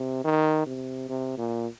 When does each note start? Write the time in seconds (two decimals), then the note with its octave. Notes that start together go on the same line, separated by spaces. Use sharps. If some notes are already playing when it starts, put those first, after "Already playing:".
Already playing: C3
0.24 D#3
0.66 C3
1.09 C3
1.37 A#2